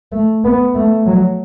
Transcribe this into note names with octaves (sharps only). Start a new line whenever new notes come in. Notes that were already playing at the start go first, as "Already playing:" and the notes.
A3
B3
A3
F#3